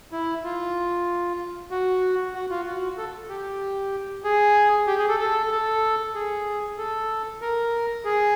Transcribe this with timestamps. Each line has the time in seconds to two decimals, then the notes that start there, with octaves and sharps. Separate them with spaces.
0.12 E4
0.44 F4
1.71 F#4
2.35 F#4
2.50 F4
2.66 F#4
2.98 A4
3.29 G4
4.24 G#4
4.87 G4
4.99 G#4
5.09 A4
5.20 A4
5.51 A4
6.15 G#4
6.78 A4
7.41 A#4
8.05 G#4